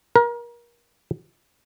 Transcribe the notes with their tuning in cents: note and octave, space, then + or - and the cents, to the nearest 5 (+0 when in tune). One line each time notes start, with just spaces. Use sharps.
A#4 +30